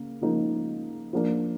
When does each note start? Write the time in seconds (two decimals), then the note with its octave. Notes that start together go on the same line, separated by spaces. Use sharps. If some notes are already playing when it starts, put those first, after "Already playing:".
Already playing: C#3 A#3
0.21 C#3 F3 A#3 D#4
1.13 F3 A#3 D4